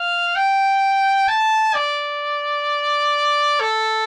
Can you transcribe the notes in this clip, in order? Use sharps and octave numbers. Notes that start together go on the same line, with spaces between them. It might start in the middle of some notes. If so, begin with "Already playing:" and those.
Already playing: F5
G5
A5
D5
A4